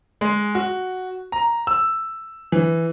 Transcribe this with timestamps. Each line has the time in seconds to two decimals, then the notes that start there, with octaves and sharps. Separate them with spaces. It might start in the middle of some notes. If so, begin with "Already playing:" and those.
0.21 G#3
0.55 F#4
1.32 A#5
1.67 E6
2.52 E3